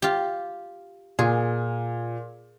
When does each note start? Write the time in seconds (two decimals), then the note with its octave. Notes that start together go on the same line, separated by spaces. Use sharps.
0.02 F4 G4
1.19 A#2 G#4